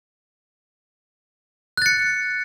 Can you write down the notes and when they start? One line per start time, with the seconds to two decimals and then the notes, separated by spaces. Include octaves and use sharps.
1.77 F#6
1.82 A6
1.86 C#7